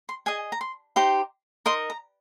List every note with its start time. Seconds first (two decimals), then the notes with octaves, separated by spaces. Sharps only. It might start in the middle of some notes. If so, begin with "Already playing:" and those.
0.09 C6
0.26 G#4 D#5 G#5
0.52 A#5
0.61 C6
0.96 D#4 G4 C5 C6
1.66 D#4 A#4 D#5 C6
1.90 A#5